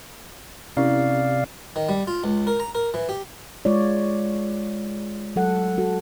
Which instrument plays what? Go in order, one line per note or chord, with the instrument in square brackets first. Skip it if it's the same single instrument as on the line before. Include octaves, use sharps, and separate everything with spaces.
[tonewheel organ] C3 D5 F5 [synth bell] C#4 E4
[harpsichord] D#3
G3
F4
C#2
A#4
A#5
A#4
E3
G4
[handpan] G#3 F4 C#5 D5
F#3 A4 F#5
F#4 A4